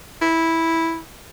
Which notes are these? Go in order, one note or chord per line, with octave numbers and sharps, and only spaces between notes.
E4